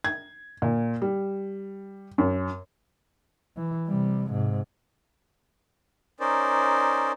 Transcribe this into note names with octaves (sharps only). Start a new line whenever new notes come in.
G#6
A#2
G3
F#2
E3
C3 G3
G#2 C3
C#4 D#4 A#4 C5 D5